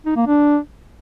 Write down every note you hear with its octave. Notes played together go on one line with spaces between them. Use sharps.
D#4
A#3
D4